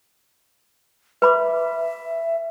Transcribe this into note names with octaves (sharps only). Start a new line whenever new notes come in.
B4 E5 B5 D6